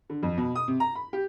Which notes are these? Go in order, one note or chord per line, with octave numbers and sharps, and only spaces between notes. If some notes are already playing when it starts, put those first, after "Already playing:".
D3
F2
B2
D#6
C3
A#5
B5
G4